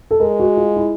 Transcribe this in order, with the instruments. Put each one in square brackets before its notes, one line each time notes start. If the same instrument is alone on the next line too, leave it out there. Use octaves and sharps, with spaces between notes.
[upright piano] A4
[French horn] G#3 [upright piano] A#4
[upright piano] F#4
F4
E4